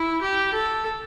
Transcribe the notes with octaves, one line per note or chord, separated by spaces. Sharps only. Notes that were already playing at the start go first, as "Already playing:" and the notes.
Already playing: E4
G4
A4